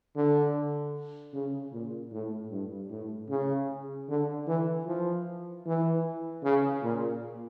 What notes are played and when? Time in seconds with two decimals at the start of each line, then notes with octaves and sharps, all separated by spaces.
0.16 D3
1.34 C#3
1.73 A#2
2.12 A2
2.51 G2
2.90 A2
3.29 C#3
4.09 D3
4.48 E3
4.87 F3
5.66 E3
6.44 C#3
6.83 A#2